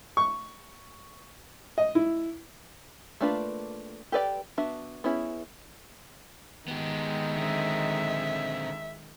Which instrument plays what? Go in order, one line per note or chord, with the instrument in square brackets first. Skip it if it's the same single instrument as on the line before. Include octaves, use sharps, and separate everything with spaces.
[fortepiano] C#6
D#5
E4
[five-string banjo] A3 A#3 D4 F4 B4
G4 A4 B4 D5 G5
B3 D4 F#4 E5
B3 C#4 E4 G#4
[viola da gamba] D#3 G#3 [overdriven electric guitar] B3 G4
[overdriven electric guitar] D3 C4 [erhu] E5